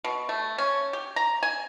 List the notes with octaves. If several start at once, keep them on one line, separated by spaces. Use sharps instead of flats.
B2
A3
C#4
G4
A#5
G#5